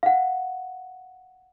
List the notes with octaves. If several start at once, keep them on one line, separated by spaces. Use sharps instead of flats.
F5 F#5